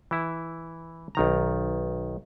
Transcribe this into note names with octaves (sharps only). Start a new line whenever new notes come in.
E3 E4
B1 D#3 A#5